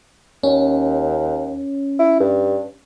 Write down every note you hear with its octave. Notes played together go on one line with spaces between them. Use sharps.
D#2 C#4
E4
G2